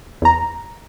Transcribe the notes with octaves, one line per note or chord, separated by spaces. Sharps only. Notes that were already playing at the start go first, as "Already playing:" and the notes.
E2 A#5